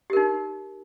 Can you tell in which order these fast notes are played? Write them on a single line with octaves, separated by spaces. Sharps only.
G4 A#4 D#4